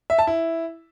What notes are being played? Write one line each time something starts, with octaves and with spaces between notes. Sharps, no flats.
E5
A5
E4